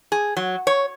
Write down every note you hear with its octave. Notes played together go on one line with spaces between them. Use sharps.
G#4
F#3
C#5